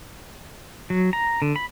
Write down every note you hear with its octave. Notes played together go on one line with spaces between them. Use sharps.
F#3
A#5
D3
B5